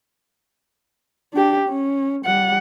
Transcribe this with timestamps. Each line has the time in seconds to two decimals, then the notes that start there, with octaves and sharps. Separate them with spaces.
1.34 D4 G4
1.69 C#4
2.25 G3 F#5